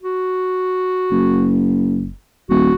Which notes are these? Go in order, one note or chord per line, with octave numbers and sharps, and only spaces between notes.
F#4
F#1
D#1 F#4